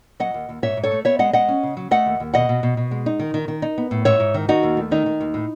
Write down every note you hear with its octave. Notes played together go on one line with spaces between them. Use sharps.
F#3 D#5 F#5
D#2
D#2
G#2 C#5 E5
G#2
A4 C#5
A3
B3 C#5 E5
G#3 D#5 F#5
G#3 D#5 F#5
C#4
C#3
F#3
A3 D#5 F#5
D#2
D#2
B2 D#5 F#5
B2
B2
B2
G#3
D#4
D#3
D#3
D#3
D#4
B3
A2
G#2 C#5 E5
G#2
D#3
D#3 D#4 F#4
D#2
A3
D#3 D#4
D#3
D#2
A2